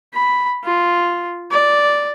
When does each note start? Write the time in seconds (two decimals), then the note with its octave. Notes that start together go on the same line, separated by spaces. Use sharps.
0.14 B5
0.64 F4
1.51 D5